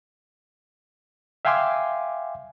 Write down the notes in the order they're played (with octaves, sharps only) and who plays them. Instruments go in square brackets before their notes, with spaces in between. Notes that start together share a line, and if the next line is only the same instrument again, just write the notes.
[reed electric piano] E5 F5 G5 G#5 C6 D6